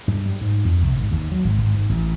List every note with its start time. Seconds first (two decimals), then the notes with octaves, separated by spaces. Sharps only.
0.08 G2
0.26 G3
0.41 G#2
0.65 F2
0.82 C2
0.97 G#1
1.11 D#2
1.32 F#3
1.45 G#1
1.58 G#1
1.74 G#2
1.90 A1